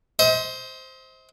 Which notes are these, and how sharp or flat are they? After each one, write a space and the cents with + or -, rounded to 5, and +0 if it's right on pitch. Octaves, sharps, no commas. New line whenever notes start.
C5 +0 D#5 +45